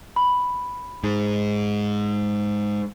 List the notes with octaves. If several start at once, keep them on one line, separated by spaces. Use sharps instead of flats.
B5
G#2